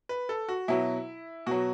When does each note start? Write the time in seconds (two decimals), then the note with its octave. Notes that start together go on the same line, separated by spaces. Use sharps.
0.09 B4
0.29 A4
0.49 F#4
0.68 B2 F#3 E4
1.46 B2 F#3 F#4